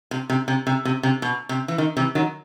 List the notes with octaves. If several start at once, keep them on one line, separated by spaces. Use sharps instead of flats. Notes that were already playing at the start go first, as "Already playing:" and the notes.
C3
C3
C3
C3
C3
C3
B2
C3
E3
D#3
C3 E3
D#3 F#3